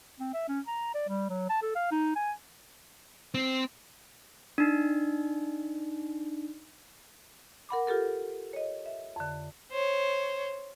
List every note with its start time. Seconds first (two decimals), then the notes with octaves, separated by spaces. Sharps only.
0.20 C4
0.33 E5
0.48 C#4
0.67 A#5
0.94 D5
1.08 G3
1.29 F#3
1.50 A5
1.62 A4
1.76 F5
1.92 D#4
2.16 G#5
3.34 C4
4.58 D4 D#4
7.69 A#4 F#5 B5 D6
7.87 F4 G4 A4 A#4
8.53 C#5 D#5
8.86 E5
9.16 F2 D3
9.72 C5 C#5